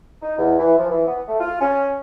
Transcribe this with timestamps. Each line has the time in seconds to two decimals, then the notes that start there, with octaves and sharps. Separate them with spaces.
0.22 D#4
0.38 E2
0.59 E3
0.78 F3
0.90 E3
1.06 B3
1.27 A3
1.40 F4
1.60 C#4